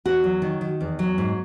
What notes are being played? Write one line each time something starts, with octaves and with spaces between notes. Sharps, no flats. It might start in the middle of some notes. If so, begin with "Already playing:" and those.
E2 F#4
F#3
D#3
D#3
E2
F#3
G#2